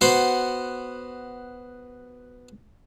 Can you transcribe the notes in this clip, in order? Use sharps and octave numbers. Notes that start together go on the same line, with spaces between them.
B3 F#4 C5